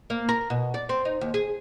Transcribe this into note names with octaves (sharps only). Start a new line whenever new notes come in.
A#3
A#4
B2
D5
C4
D#4
D#2
G#4